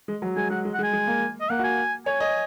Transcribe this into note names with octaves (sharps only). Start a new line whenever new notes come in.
G#3
F#3
G#3 G#5
G#3 F#5
G#3
F#5
G#3
G#5
G#3
A#3
D#5
A#3 F#5
F#4
G#5
C#5 G#5
D#5